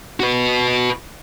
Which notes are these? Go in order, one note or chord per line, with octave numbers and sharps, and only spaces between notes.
F#4 B4